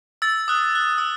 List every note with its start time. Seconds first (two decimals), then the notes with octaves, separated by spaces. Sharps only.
0.22 E6 A6
0.48 D#6 F#6
0.75 F#6
0.98 E6